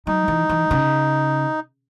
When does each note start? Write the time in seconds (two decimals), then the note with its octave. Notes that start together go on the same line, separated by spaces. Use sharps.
0.07 F#3 D#4
0.28 E3
0.49 E3
0.71 C#3